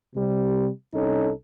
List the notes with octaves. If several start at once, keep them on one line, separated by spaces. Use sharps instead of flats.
C3 G3
C2 C#4 D#4 A4